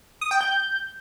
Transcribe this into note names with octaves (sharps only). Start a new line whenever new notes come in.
D#6
G5
G6